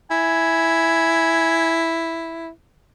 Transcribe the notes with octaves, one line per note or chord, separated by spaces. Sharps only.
E4 G#5